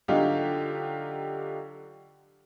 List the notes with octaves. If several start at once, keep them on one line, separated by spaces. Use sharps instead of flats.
D3 F#3 D4 D#4 F4 G4